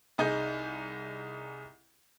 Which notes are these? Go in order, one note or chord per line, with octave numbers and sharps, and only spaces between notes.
C2 D#4 G#4 G6